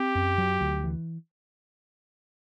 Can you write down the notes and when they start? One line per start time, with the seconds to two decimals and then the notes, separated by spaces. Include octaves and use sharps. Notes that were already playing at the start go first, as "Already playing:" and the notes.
Already playing: C4 G4
0.15 F#2
0.38 F#3
0.61 D2
0.84 E3